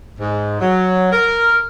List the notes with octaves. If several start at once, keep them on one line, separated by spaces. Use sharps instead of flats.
G#2
F#3
A#4